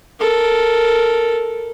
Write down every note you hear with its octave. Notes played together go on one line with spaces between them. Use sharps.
A4 A#4